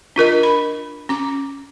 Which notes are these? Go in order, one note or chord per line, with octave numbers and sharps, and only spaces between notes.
D4 F4 A#4 D#5
B5
C#4 D6